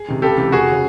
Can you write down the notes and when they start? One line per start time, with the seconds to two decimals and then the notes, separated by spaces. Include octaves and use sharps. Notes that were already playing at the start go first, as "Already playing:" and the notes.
Already playing: G#4
0.08 C3 D#3
0.22 C#2 G4 A4
0.37 C3 E3
0.52 F1 F#4 G#4
0.71 C#3